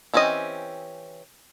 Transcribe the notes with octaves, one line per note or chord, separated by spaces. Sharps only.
E3 C4 C#4 G4 D#5